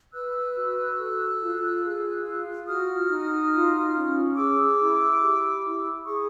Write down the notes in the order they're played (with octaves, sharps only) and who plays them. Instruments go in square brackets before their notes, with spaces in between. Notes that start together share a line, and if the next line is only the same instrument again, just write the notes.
[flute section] B4 E6 F#6
F#4
A4
F4
G#4
F4
F#4 D#6 F6
D#4
F4
C#4
G#4 D6 E6
E4
G4
E4
G#4 C#6 D#6